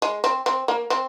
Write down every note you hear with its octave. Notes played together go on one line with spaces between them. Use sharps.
G#3
C4
C4
A#3
C4